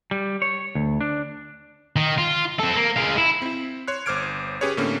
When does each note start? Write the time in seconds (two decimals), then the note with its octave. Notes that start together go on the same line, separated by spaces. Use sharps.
0.11 G3
0.42 C#5
0.75 D2
1.01 D4
1.96 D#3
2.18 F4
2.59 C4 A4
2.75 A#3
2.96 G#3 F5
3.17 E4
3.42 C4 E4
3.88 C#5 C6 F#6
4.06 G1 C5 D6 F6 G#6 D7
4.61 C#4 G4 G#4 B4 C#5
4.77 A2 D3 A#3 C4 C#4 F6